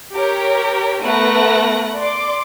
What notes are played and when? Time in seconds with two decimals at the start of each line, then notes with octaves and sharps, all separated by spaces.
0.14 G4 A#4 C#5 B6
1.02 A3 B3 A#4 B4 F#6 A#6
1.97 D5 C6 D6